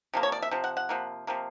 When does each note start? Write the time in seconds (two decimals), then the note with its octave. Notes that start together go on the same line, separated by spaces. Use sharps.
0.14 C3 F3 A#3
0.23 C#5
0.32 D5
0.42 E5
0.51 C3 F3
0.64 F#5
0.77 F#5
0.89 C3 F3 A#3
1.27 C3 F3 A#3